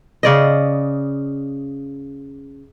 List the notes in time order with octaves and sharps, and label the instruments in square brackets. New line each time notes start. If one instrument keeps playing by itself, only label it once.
[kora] C#3 D5 D#5